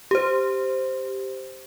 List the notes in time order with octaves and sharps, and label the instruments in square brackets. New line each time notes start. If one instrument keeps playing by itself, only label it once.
[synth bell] G4 C5